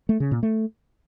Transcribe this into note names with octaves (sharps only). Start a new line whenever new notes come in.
A3
C#3
A#2
A3